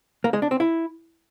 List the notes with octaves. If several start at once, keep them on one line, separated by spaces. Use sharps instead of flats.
A#3
G#3
D4
C4
E4